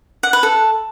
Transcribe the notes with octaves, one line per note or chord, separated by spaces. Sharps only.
F#5
B4
A4